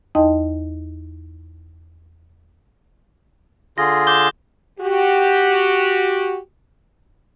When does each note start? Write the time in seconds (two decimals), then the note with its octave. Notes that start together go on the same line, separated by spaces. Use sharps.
0.15 E2 D#4 D#5 G5 A5 C6
3.78 D3 F4 G#4 A#6
4.07 D6 G6 G7
4.80 F#4 G4